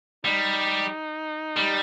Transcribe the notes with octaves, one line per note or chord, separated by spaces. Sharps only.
G3 D#4
G3